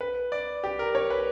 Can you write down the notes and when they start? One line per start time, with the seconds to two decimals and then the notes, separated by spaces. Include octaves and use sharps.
0.01 B4
0.32 D5
0.64 G4
0.79 A#4
0.95 C#5
1.10 B4